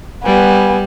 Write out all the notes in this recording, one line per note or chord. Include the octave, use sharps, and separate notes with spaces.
G3 B3 G#5